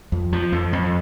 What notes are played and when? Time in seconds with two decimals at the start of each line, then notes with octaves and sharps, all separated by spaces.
0.12 F2
0.33 F3
0.52 F2
0.73 F2